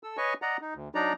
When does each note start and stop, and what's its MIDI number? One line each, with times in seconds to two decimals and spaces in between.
0.03 0.17 69
0.03 0.17 88
0.17 0.34 71
0.17 0.34 73
0.17 0.34 75
0.17 0.34 80
0.17 0.34 85
0.42 0.57 74
0.42 0.57 75
0.42 0.57 78
0.42 0.57 82
0.62 0.74 63
0.75 0.88 38
0.95 1.13 54
0.95 1.13 62
0.95 1.13 63
0.95 1.13 74
0.95 1.13 82